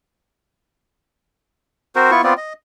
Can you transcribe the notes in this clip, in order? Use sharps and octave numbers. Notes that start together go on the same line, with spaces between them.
C4 F#4 A#4 C5
B3 E4 F4 C#6
B3 C4 F4 D5
D#5